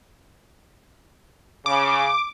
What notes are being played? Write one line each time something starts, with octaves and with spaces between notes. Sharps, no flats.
C#3 D6